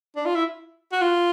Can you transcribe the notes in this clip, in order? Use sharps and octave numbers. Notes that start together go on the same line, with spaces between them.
D4
F4
E4
F#4
F4